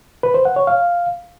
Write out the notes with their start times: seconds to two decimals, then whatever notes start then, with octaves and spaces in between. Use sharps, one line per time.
0.23 B4
0.34 C5
0.45 F#5
0.56 C#5
0.67 F5